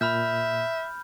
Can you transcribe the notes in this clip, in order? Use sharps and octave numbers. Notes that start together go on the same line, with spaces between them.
A#2 E5 B5 F6 G6